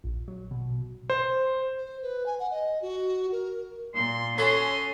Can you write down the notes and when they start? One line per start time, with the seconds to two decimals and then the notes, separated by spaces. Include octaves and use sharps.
0.04 A#1
0.28 F#3
0.51 B2
1.10 C5
1.77 C5
2.02 B4
2.26 G#5
2.40 F#5
2.51 D#5
2.82 F#4
3.32 A#4
3.95 A#2 C6
4.38 C#4 F#4 G#4 A4 C6